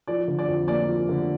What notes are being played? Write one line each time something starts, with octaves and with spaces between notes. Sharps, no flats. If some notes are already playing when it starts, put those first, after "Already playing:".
F3 D5
D3
D5
F2
A#3 D5
F3
D3